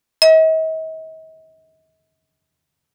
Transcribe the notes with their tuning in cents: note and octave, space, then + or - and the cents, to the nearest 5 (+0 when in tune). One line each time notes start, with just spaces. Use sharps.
D#5 +45